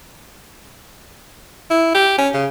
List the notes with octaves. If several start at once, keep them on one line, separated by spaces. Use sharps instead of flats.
E4
G4
C#4
C#3